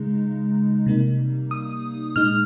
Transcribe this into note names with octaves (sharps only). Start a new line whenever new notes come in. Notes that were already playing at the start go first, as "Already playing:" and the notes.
Already playing: C#3 G#3 D#4
C3 G3 A#3 D#4
D#6
A#2 G#3 D#4 F6